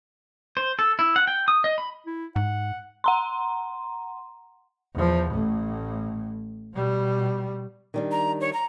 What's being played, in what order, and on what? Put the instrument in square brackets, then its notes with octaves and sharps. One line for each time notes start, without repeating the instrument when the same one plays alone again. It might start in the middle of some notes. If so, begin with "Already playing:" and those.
[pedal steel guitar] C5
A4
E4
F#5
G5
D#6
D#5
B5
[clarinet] E4
[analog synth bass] G#2 [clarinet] F#5
[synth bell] F#5 A#5 C6
[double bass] E2 F3
A1 A2
B2 G3
[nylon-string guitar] D#3 G3 D4
[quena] A#5
C#5
A#5